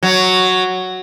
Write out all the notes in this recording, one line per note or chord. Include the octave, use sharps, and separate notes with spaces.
F#3